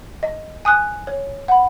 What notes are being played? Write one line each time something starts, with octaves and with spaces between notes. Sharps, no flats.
D#5
G#5 D#6 F#6
C#5
F#5 B5